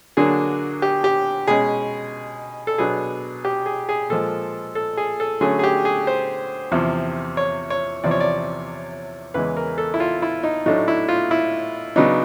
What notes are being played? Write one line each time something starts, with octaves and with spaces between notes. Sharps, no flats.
D3 F#3 A#3 D4 G#4
G4
G4
B2 G#3 C#4 G#4
A4
B2 F#3 B3 D4 G#4
G4
G#4
G#4
A#2 F3 G#3 A4
A4
G#4
A4
D3 F#3 A3 C#4 G#4
G#4
G4
G#4
C5
E2 C3 F3
C#5
C#5
E2 C3 F3 D5
C#5
D5
E2 C#3 E3 G#3 B4
A#4
A4
E4
F4
E4
D#4
A2 F#3 A3 D4 D#4
E4
F4
E4
C#3 F#3 B3 D4 D#4